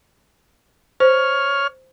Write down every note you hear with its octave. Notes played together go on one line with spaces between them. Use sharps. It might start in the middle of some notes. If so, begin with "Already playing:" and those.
C5 C#5 F6